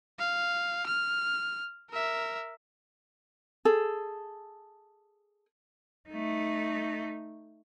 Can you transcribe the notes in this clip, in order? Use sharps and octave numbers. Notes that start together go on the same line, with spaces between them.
F5
F6
A#4 E5
G#4 A4
A3 D#4